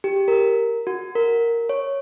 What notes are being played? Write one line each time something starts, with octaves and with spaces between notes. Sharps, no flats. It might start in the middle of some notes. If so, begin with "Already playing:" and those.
G4
A#4
F#4
A#4
C#5